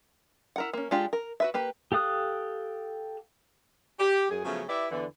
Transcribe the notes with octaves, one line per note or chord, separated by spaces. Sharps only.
E4 A#4 F#5
A#3 C#4
G#3 D4 F4 G4
A#4
F#4 B4 E5
A#3 G4 B4
G4 A4 F5 D#6 F#6
G4
F#2 G#4
C#3 F3 F#3 A3 B3 C#4
E4 G4 B4 D5 E5
E2 D3 E3